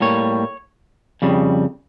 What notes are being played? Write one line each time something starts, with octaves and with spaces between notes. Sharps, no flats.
A2 G3 A#3 C#5
F2 C#3 G3